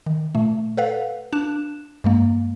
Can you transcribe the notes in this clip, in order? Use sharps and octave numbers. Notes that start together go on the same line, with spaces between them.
D#3
A#2 A3
A4 B4 F5 F#5
D4 F#6 E7
G2 G#3 A#3